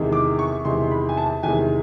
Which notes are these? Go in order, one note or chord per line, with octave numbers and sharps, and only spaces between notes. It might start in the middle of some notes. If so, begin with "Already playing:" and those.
Already playing: E2 C3 D#3 G#3
D6
C#6
E2 C3 D#3 G#3 C6
C6
B5
G#5
A5
E2 C3 D#3 G#3 G#5